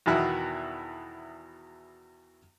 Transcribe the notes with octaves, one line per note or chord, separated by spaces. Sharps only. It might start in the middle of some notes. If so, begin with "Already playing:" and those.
E2 B2 D#3 E4 F#4 E5